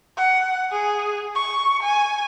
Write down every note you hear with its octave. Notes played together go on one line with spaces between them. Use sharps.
F#5
G#4
C#6
G#5